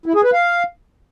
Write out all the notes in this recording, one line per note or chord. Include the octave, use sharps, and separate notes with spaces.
E4
G#4
B4
F5